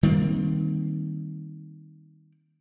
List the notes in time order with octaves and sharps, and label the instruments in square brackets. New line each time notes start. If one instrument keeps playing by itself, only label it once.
[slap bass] D#3 G3 A#3 C4